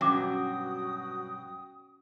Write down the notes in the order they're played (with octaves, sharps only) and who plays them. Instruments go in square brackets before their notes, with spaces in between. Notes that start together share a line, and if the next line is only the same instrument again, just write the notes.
[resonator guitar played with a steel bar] G2 B2 F#3 [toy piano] C#4 D6 [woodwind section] F#4 G5 D#6